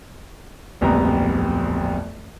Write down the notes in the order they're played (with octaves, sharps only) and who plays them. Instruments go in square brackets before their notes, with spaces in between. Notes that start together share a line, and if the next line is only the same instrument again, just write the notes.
[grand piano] D1 A#1 F2 G3 B3 A#5